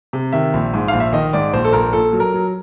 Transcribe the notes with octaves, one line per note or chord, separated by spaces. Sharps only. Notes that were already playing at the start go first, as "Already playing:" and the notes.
C3
D#3 E5
A#1
G#2
A#1 F5
E5
D#3 D#5
G#2 D5
A#1 C5
A4
A#1 A#4
A#2 A4
F#3
A#4
F#3